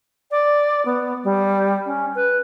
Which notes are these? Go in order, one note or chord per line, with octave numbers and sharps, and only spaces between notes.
D5
B3
G3
C#4
B4